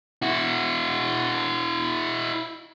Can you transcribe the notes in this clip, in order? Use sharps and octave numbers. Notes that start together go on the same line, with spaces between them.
E4 F#4